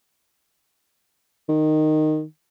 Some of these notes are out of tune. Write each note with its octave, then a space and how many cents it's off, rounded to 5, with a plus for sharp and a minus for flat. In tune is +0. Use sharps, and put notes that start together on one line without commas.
D#3 -10